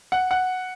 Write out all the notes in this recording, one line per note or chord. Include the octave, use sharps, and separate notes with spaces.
F#5
F#5